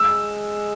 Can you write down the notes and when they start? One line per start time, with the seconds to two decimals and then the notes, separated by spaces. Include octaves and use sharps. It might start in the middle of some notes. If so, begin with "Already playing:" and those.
Already playing: G#3 E6